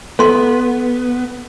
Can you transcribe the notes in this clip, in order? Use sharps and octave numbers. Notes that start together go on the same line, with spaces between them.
B3 A4 C6